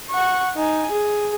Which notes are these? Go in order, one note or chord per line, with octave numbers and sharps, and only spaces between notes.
F#5 C#6
D#4 G#5
G#4